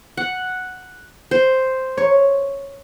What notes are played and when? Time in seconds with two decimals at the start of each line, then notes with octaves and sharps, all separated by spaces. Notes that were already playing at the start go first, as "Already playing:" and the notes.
0.17 F#5
1.31 C5
1.97 C#5